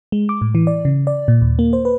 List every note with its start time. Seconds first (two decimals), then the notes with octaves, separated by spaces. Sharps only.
0.12 G#3
0.29 D6
0.41 A2
0.55 E3
0.67 D5
0.85 C#3
1.07 D5
1.28 A#2
1.41 D#2
1.59 A#3
1.73 C5
1.85 B4